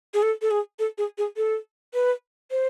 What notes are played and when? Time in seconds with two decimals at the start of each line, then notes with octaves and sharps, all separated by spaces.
0.14 G#4
0.23 A4
0.42 A4
0.51 G#4
0.79 A4
0.98 G#4
1.18 G#4
1.37 A4
1.94 B4
2.51 C5